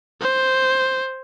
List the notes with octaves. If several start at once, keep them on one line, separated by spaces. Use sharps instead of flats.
C5